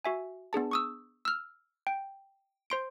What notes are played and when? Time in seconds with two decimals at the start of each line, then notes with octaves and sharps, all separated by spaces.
0.05 F#4 E5 G#5
0.53 B3 D4 G#4 A5
0.71 C#6 D#6 E6
1.25 E6 F6
1.87 G5
2.70 C5 C6 D7